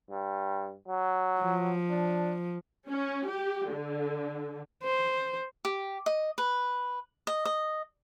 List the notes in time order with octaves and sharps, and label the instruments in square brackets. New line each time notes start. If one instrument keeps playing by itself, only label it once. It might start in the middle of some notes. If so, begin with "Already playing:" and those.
[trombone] G2
F#3
[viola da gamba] F3
[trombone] D4
[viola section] C#4
G4
D3
[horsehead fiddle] C5
[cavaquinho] G4
D#5
B4
D#5
D#5